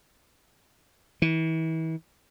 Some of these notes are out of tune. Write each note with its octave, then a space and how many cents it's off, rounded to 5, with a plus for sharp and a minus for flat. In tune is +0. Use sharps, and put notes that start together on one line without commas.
E3 -35